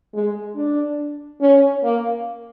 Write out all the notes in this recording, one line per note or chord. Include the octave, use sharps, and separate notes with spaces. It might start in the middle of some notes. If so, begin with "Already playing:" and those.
G#3
D4
C#4
A#3